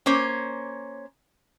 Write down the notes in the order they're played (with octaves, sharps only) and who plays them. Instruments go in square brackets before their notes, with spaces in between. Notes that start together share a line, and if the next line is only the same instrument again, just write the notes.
[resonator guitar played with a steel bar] A#3 C#4 C5 C#5